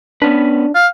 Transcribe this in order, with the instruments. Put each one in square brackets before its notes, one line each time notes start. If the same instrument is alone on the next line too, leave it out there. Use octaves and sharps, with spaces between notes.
[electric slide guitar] B3 C#4 B4 [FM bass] D4
[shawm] F5